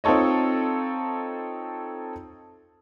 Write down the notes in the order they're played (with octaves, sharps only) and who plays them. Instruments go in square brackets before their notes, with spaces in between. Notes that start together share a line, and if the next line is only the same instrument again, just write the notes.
[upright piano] C4 D#4 F4 A4 C#5 D#5